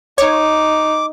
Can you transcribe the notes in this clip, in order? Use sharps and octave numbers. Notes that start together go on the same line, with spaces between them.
D#4 C#5 D6